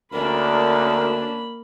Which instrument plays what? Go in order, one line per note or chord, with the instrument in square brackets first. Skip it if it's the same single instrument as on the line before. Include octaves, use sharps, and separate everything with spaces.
[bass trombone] D2 [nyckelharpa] A#3 B5 [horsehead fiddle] C#4 D4 [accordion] A#4